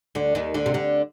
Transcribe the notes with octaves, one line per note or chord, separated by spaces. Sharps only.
D2 D3
D#2 D#3
D2 D3
C3
D2 D3